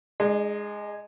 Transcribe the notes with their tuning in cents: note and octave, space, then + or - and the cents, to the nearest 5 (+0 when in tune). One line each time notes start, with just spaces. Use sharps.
G#3 +0 D4 +45